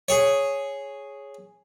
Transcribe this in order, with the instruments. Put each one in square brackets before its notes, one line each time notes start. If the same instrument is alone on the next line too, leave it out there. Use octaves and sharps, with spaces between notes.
[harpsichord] G#4 C#5